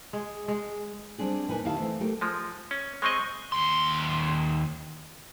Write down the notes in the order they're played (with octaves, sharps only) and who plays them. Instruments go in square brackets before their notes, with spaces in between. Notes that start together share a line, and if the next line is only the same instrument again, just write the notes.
[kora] G#3
G#3
[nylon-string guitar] G3 C4 D4 G#4
A#2 D#4 A#4 B4 G#5
D#2 D#3 E4 G4 F5 A5
E3 A3 C4
A3 G4 A#4
[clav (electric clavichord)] F3 G#3
C#4
[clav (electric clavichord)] G#3 C4 D#5 [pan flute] C#6
[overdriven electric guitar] D#2 C6